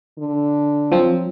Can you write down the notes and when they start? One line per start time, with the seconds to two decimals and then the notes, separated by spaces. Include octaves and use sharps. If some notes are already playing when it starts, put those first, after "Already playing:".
0.19 D3
0.92 F3 F#3 C4